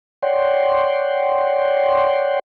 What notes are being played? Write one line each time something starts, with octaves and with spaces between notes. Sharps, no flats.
C#5 D5 F#5 G5 C6